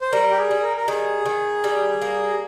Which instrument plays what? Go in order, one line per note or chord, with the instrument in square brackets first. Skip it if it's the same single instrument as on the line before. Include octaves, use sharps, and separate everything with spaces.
[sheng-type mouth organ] C5
[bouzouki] G3 [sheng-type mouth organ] A#4
[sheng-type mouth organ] G4
G#4
[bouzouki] G3
[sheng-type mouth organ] A#4
A#4
[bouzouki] D#3 [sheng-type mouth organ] G#4
[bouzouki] D#3
G3
A#3